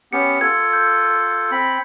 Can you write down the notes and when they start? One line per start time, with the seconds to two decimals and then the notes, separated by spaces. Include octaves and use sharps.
0.13 B3 C#4 G4 C#7
0.41 F4 A4 G#6
0.73 G6
1.51 C4 B5